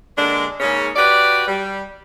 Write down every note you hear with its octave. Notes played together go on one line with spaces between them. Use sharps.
D3 G#3 A#3 D4
G#2 C#3 A#3 C#4
F#4 G4 B4 D5
G3